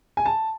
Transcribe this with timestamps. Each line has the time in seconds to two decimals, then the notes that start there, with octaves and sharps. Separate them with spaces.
0.17 G#5
0.26 A5